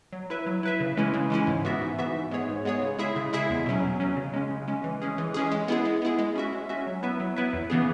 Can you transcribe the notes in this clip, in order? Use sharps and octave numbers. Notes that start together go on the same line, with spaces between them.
F#3
E4 B4 E5
F#3
E4 B4 E5
C#3
E3 G#3 C#4 E4
C#3
E3 G#3 C#4 E4
G#2
E3 B3 F#4 E5
G#2
E3 B3 F#4 E5
G#2
G#3 B3 G#4 C#5
G#2
G#3 B3 G#4 C#5
C#3
G#3 E4 G#4 E5
C#3
G#3 E4 G#4 E5
E2
B2 F#3 C#4
E2
B2 F#3 C#4
C#3
G#3 C#4
C#3
G#3 C#4
E3
G#3 C#4 G#4
E3
G#3 C#4 G#4
G#3
B3 E4 G#4
G#3
B3 E4 G#4
G#3
C#4 F#4 E5
G#3
C#4 F#4 E5
F#3
B3 E4 B4 E5
F#3
B3 E4 B4 E5
E2
C#3 E3 B3 G#4